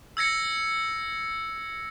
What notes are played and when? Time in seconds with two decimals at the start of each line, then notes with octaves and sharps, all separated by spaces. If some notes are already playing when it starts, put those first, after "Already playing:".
0.17 E6 G#6 A#6 C#7